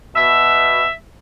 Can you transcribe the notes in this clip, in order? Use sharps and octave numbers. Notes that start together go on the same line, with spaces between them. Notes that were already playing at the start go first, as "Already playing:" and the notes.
B2 E5